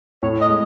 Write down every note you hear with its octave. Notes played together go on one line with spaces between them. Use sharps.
A2 C#5
D#5
G#3